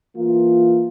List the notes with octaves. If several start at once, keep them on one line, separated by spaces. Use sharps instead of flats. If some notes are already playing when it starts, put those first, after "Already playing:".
E3 A#3 F4